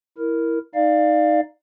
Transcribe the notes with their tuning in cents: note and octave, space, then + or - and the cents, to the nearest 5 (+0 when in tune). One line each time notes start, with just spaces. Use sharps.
E4 +0 A#4 +0
D#4 +0 D5 +15 F5 +0